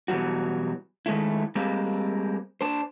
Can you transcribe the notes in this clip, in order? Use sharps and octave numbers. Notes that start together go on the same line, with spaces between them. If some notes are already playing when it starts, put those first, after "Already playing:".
B2 E3 F#3 G3 F#4
D#3 G#3 A3 E4
G3 G#3 A#3 C4
D4 C5